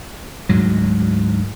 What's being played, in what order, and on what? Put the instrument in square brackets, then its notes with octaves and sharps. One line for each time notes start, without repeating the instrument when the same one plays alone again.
[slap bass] D2 G#2 F#3